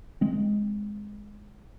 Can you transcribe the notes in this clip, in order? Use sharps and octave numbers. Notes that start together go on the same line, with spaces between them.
G#3 C4